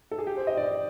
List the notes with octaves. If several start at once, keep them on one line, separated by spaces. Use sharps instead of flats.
A4
G#4
G4
C5
D#5
D5